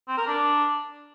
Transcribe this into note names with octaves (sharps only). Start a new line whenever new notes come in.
C4
A#4
D4